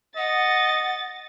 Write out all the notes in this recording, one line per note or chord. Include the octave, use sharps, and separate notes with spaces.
D#5 F#5 A6